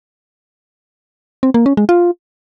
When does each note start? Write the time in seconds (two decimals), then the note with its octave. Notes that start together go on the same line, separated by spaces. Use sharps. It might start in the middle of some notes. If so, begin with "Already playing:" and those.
1.43 C4
1.54 A#3
1.66 C#4
1.77 G#3
1.89 F4